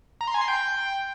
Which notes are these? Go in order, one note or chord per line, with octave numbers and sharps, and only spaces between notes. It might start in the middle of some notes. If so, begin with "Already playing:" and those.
A#5
C6
G#5
C6
G5